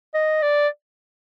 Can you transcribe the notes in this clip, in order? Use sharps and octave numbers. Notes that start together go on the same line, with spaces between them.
D#5
D5